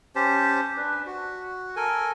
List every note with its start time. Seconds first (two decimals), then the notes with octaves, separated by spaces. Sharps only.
0.15 C#4 G4 C5 A5
0.77 D4 B4
1.06 F#4
1.76 A4 A#4 G#5